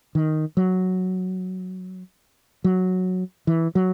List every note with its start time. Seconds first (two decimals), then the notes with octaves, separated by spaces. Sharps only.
0.15 D#3
0.57 F#3
2.64 F#3
3.47 E3
3.75 F#3